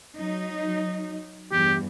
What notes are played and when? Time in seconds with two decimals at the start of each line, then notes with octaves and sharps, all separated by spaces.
0.16 F#3 D#4
1.52 E2 G2 G4